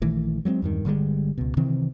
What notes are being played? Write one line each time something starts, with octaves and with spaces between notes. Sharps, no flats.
A#1 D#3 E3 A3
F#3 G#3 A3 C4
E2 G2 D#3
G1 D3 G3 G#3
C#2 B2
C3 D#3 E3 C4